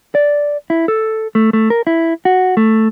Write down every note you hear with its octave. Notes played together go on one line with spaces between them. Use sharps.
D5
E4
A4
A3
A3
A#4
E4
F#4
A3